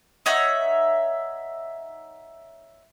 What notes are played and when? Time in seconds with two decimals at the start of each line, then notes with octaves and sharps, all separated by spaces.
0.26 D#4 C#5 E5 F#5